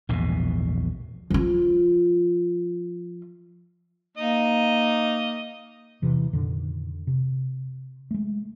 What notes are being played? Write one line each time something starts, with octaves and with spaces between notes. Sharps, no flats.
A#1 E2 G#2 B2
F3 F4
A#3 D#4 D#5
E1 C3 E3
F2 A#2 D3 D#3
C3
G#3 A3